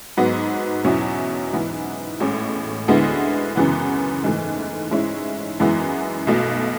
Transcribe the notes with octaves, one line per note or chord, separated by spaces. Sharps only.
G#2 F#3 B3
E2 B2 F#3 C#4 E4
G#2 E3 B3 E4
A1 A2 G#3 C#4
D2 D3 G#3 B3 E4
F#2 C#3 E3 B3
G#2 E3 A3
G#2 G#3 C#4 E4
F#2 E3 G#3 B3 E4
B1 B2 A3